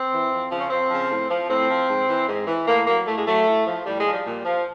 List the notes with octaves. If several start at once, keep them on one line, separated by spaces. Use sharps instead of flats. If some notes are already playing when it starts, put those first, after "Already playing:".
Already playing: C4
E3
F2
C#3 F3
C#4
F2 C4
C#3 F3
A2
F3
A2 C4
F3
G#2
E3
G#2
E3
A2 A#3
F#3 A#3
A2 A3
G#3
F#3 A3
A2
F3
A2 G3
F3 G#3
G3
A#2
F3